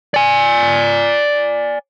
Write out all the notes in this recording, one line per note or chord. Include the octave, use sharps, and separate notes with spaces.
D5 G#5